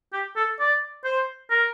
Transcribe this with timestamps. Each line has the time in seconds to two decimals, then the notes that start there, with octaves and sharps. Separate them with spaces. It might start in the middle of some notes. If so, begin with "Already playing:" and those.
0.13 G4
0.36 A4
0.60 D5
1.05 C5
1.50 A#4